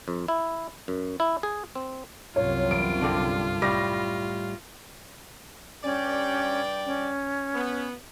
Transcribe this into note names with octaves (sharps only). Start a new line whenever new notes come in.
F2
E4
F#2
E4
G#4
C4
C2 F#2 C3 F4 C#5
E2 D7
G2 D3
A2 G3 A#6
G2 C#4 D5 G5
C#4
B3